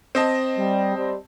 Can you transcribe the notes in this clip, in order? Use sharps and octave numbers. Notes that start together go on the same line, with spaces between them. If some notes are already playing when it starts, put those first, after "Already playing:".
C4 D#5 A5
G3
G3 C5